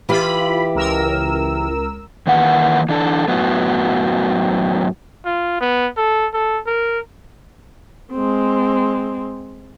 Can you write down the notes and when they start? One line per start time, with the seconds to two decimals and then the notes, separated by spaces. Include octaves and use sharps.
0.09 E3 F4 G4 B5
0.75 C#2 A#4 E6
2.27 D#3 E3 A#3 B4 F#5
2.89 E3 D4 A4
3.28 F#2 A2 F#3 B3
5.25 F4
5.61 B3
5.97 A4
6.33 A4
6.66 A#4
8.12 G#3 C4